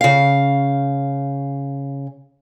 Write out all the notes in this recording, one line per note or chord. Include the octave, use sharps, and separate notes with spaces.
C#3 F5